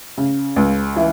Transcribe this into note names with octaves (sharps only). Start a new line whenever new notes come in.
C#3
C#2
E3